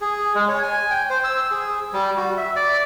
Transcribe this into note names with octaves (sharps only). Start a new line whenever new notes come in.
G#4
G#3
C#5
G#5
G5
C5
E6
G#4
G3
F#4
E5
D5